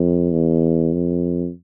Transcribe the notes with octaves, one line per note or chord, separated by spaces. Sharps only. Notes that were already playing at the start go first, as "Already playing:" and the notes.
Already playing: F2
E2
F2